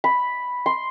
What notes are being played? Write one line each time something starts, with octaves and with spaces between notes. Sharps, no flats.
B5
C6